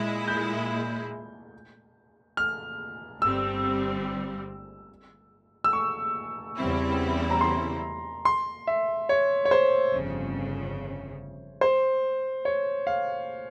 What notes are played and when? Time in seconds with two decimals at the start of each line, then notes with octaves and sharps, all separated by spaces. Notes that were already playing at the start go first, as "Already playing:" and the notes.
Already playing: A#2 G#3 E4
0.28 G6
2.37 F6
3.21 G1 G2 G3 C4 E6
5.64 E6
5.73 C#6
6.57 E2 C#3 G3 C4 E4
7.30 A#5
7.41 C6
8.25 C6
8.67 E5
9.09 C#5
9.45 C#5
9.51 C5
9.93 G1 F2 C#3
11.61 C5
12.45 C#5
12.87 F5